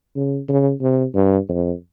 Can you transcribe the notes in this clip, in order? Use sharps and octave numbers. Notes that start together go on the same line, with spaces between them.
C#3
C#3
C3
G2
F2